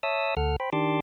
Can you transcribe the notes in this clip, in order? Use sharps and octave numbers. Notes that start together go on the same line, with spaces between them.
C#5 E5 A5 D#6 E6
D2 A4 F#5 F6
C5 G5 B5
D#3 D4 G4 A5 C6 D6